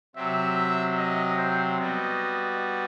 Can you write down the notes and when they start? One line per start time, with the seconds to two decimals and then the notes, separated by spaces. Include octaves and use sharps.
0.16 C3 F#3 C4 E5
0.97 D#5
1.38 C5
1.78 G3 B3 F#4 D#5